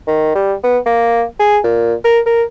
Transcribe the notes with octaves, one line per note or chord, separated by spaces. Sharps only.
D#3
G3
B3
A#3
G#4
A#2
A#4
A#4